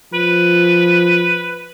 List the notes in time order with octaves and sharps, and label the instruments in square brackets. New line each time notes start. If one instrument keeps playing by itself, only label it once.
[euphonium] F3 [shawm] B4